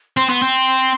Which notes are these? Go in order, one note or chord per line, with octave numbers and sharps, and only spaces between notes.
C4 C6
B3
C4